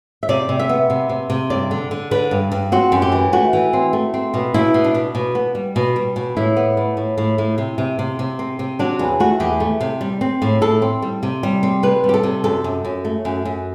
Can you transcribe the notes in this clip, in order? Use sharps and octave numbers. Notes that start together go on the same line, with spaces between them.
E5
C3 D5
C3
E5
B3
C3
C3
C3
G2 D5
D3
D3
D3 B4
G2
G2
C4 F#4
F#2
G4
E3
A3 F#4
E3
C4
A3
C4
B2
B2 E4
B2
D4
B2
B2
B3
G3
B2
G3
B2
A2 E4
B3
A2
A2
A2
A2
C3
C3
C3
C3
C4
C3
F#3 D4
E2
A3 F#4
E2 G4
A3
C3
G3
C4
A2
A2 A4
C4
G3
C3
G3
C4
C3 B4
G3
G4
A4
C3
F#2 A4
F#2
F#2
A3
F#2
F#2